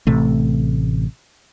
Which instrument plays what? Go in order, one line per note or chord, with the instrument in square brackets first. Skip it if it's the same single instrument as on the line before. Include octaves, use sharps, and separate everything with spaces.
[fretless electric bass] A1 C3 A3